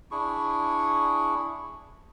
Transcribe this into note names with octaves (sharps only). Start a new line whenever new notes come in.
D4 E4 G#4 C#6